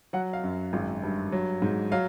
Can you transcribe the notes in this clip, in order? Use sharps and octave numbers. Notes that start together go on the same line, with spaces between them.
F#3 F#5
F5
F#2
G#1
G2
F#3
G#2
F#3 F5